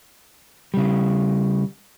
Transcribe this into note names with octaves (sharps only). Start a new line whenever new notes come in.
C#3 G3